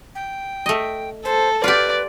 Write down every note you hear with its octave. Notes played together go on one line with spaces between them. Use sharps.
G5
A3 D#5
A4 C5
F4 G4 B4 D5